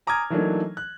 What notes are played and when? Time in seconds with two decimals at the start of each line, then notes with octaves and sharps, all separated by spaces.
0.07 G#5 A#5 D6 D#6 F6 G#6
0.30 E3 F#3 A3 A#3 D4 D#4
0.77 F#6